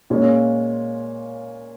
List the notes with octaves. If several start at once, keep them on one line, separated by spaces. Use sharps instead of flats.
A#2 G#3 C#4 F4